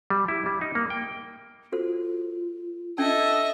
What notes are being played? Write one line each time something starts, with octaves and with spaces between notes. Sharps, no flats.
G3
E4
G3
D#4
A#3
G5
F4 F#4 A4 C5
C#4 D4 A4 D#5 E5 A5